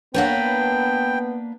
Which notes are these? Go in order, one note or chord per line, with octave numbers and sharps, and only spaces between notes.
A#3 B3 D4 B4 C#5 F#5 G5